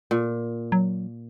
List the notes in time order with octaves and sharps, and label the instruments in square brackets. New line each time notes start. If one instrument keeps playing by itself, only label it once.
[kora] A#2
[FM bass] F#3